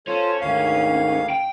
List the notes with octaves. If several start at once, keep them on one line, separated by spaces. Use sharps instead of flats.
C#4 F4 A4 C5 C#5
D2 G#2 D#3 F5
G5